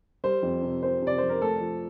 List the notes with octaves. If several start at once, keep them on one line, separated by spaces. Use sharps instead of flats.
G3 C5
F2
C3
C4 C5
C3 D5
F2 C5
A#4
A3 A4
F3